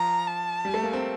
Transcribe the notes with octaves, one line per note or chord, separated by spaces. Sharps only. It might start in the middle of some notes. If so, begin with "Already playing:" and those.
Already playing: F3 A#5
A5
G3
A3
A#3
C4